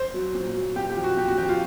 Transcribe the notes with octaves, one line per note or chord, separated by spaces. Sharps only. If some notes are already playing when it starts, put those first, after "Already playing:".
Already playing: C5
F#3
A#2
F#3
A#2 G4
G4
F3
F#4
A#2 G4
F#4
F3 G4
F4